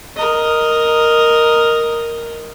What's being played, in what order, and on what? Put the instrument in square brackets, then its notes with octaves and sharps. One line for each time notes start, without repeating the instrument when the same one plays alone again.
[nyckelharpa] A#4 D#5